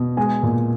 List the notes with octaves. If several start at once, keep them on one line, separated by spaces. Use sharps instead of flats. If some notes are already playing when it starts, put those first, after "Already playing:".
Already playing: B2
G#3 G#4 G#5
A#2